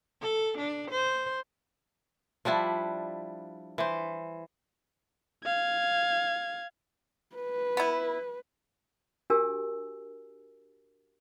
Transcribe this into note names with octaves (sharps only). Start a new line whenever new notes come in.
A4
D4
C5
F3 G3 D4 E4
E3 C5
F5 G#6
B4
B3 E4
D4 F#4 G4 A#4 G#5 E6